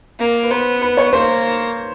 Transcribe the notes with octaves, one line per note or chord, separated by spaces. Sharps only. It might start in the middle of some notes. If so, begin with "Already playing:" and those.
A#3
B4
B3 C5
B4
C#5
A#3 C5